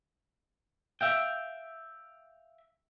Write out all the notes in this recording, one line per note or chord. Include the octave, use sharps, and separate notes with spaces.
E5 F5 G5